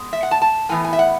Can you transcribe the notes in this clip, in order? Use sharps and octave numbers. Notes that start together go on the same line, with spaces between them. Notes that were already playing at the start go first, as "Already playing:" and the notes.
Already playing: G#3 B3
E5
F#5
A5
A5
A2 E3 B3 G#5
G#5
E5
F#5